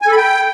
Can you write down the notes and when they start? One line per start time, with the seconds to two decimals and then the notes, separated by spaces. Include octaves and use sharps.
0.02 G#5
0.07 A4
0.12 B5
0.17 G5